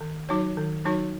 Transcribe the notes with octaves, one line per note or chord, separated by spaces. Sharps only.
D#3
F#3 D#4 F#4 C#5
D#3
F#3 D#4 F#4 C#5